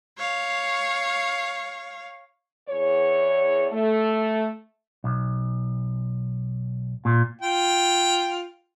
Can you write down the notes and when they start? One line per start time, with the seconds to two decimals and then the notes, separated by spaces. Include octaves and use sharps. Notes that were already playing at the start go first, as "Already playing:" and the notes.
0.18 C#5 F5
2.69 E2 C#5
3.71 A3
5.04 B1
7.05 A#2
7.41 F4 G5